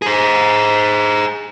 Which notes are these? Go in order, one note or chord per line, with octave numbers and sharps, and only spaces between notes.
G#4 C5